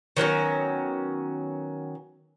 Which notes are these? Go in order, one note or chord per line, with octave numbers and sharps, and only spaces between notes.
D#3 F#3 B3 C#4